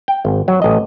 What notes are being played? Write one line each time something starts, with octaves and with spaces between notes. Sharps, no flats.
G5
G#1
F#3
A1 D#5